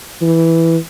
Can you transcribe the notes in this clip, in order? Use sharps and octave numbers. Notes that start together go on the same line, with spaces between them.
E3